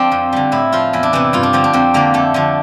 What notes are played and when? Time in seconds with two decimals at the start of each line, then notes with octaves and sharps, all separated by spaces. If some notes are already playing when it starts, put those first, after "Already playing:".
Already playing: F3 C4 D4
0.12 F2
0.32 D3 G3
0.52 A2 E4
0.72 F3 F4
0.93 E2 E4
1.03 D4
1.13 C3 E3 E4
1.33 G2 F4
1.43 D4
1.53 D3 F3 C4
1.64 D4
1.73 F2 C4
1.94 D3 F3 A#3
2.14 F2 A3
2.34 D3 F3